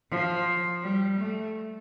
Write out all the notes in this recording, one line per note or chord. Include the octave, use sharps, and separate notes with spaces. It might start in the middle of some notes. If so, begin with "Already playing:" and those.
F3
G3
A3